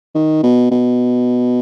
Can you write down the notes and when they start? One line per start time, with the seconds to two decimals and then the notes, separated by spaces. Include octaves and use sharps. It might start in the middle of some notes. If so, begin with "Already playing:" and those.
0.15 D#3
0.43 B2
0.71 B2